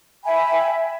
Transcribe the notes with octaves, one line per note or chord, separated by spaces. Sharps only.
E5 G5 G#5 B5